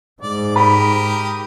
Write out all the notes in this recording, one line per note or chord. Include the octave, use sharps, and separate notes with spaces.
G#2 D5
G4 A#4 B5 D#6